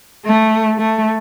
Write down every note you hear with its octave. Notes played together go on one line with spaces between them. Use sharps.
A3
A3